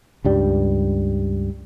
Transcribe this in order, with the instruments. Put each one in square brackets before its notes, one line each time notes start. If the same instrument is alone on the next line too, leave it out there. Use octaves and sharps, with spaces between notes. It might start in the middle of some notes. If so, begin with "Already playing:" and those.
[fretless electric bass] C#2 G2 G3